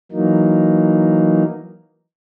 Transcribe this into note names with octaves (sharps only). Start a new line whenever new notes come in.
E3 F#3 A#3 D#4